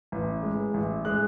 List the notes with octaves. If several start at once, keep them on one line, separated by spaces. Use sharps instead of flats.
A1
G#3
A1
G#3 F#6